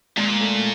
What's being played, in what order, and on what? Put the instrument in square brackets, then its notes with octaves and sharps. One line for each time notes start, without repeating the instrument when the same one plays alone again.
[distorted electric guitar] A#2 [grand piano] G#3
[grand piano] A3